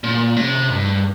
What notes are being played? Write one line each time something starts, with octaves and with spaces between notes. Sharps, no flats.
A#2
C3
G2